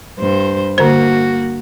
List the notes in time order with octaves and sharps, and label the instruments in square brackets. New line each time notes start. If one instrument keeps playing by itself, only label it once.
[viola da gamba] G2 C5
[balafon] D3 C5 [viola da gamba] A#3 F#4